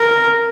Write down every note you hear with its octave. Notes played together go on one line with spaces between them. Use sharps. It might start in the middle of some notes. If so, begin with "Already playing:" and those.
Already playing: A#4